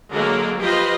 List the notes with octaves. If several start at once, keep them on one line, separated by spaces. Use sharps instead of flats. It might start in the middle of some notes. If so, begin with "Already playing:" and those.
D3 F#3 G#3 A#3 A#4
F3 F4 G4 B4 C5 D#5